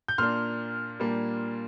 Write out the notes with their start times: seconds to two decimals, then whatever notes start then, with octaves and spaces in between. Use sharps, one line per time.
0.08 G6
0.18 A#2 A#3 D4 C6 F6
1.00 A#2 G3 A#3 D4